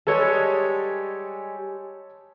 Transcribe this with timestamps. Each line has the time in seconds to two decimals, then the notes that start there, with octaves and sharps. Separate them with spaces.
0.07 G3 G#3 A4 B4 C#5